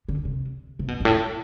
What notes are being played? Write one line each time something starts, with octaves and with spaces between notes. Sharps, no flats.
D3
C3
C3
B2
G2
A2